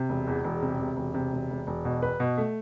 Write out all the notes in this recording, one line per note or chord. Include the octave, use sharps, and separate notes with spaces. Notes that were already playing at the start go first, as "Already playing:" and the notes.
Already playing: C3
E1
E2
E1
C3
C3
E1
C3
E1
E1
E1
B2
B4
B2
A3